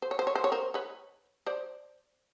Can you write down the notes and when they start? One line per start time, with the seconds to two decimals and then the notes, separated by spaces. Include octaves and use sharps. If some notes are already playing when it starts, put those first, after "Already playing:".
0.02 C5
0.11 C#5
0.19 C5
0.27 C#5
0.35 C5
0.44 C#5
0.52 A#4 C5
0.74 B4 C#5
1.46 C5 D5